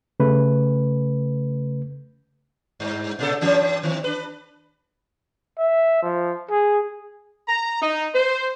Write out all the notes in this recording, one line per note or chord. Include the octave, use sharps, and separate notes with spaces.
C#3 A3 B4
G2
A#2 C#3 A4
G2 E3 C#4
D#3 C4
D4 B4
E5
F3
G#4
A#5
D#4
C5